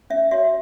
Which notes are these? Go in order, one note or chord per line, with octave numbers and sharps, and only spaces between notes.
C#4 E5
F#4 C#5 E5